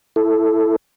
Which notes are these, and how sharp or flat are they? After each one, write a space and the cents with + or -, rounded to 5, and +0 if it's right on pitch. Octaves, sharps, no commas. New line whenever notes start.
E4 +0 A4 +0